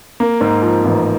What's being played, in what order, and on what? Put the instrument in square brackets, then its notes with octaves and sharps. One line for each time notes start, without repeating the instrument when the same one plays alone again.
[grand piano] A#3
G#2
F3
A1